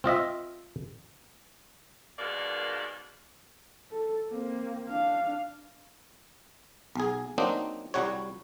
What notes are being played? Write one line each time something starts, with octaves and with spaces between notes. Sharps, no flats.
C4 F4 D#5 E5
D#2 G#2 B2 D#3 A#3 D5
A4
A#3 C4
D4 F5
B1 G#4
F#3 A#3 C4 D4 D#4
C2 G3 F#4 C#5